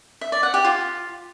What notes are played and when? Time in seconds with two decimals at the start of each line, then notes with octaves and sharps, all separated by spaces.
0.21 E5
0.32 D5
0.43 F#5
0.54 G4
0.65 F4